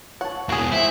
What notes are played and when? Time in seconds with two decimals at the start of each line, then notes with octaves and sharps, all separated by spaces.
0.21 C#5 F#5 A5
0.49 E2 G#3 F#4 G#4
0.72 E4 C5 F#5 G#5